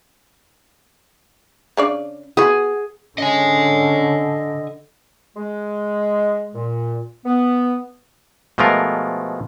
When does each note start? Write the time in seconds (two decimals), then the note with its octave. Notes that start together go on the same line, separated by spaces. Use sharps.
1.77 C#3 D4 D5
2.37 B3 F#4 G#4
3.18 D3 C#4 D#5 G#5
5.37 G#3
6.55 A#2
7.26 B3
8.58 B2 F3 G#3 A3 F4 A#4